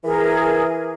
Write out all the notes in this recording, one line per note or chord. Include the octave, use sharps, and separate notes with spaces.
E3 G#4 A#4